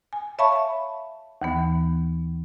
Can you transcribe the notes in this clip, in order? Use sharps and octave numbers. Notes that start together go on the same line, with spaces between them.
G#5
C#5 E5 F5 A5 B5 C#6
D#2 E3 B3